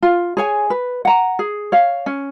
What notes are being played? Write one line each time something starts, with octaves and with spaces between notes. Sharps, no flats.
F4
G#4 C#5 G#5
B4
F#5 A#5
G#4
C#5 F5
C#4